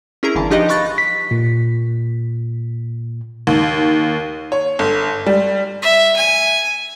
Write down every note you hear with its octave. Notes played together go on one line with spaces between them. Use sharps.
C#4 E4 G#4 A#4 A#5
G1 D3 E3 A5
F3 D4 D#4 G4 B4 D#5
F5 B5 C#6 F#6 A6 A#6
B6
A#2
D#2
C#5
G1
G3
E5
G#5